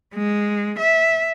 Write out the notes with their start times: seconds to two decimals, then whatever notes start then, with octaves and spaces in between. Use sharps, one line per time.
0.15 G#3
0.79 E5